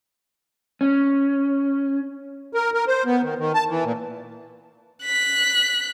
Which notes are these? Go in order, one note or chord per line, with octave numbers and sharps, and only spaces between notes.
C#4
A#4
A#4
C5
B3
D#3
D#3
A5
E3
A#2
F#6 B6